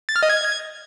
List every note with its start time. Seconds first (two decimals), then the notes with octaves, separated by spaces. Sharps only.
0.09 A6
0.16 F6
0.23 D#5
0.30 G#6